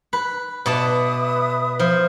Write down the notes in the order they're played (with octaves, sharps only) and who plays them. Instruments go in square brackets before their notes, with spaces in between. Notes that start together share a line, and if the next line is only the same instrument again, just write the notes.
[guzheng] B4
[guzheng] B2 D5 A5 [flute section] B4 E5 D#6
[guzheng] F3